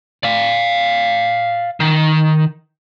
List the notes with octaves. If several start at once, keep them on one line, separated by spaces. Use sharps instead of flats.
D5 F5
D#3